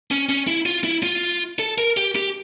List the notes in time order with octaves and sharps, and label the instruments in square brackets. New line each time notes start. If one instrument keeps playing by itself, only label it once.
[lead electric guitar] C#4
C#4
E4
F4
E4
F4
A4
A#4
G4
G4